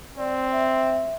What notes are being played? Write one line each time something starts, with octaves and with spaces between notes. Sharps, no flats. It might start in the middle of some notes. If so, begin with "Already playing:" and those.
C4 D5
E5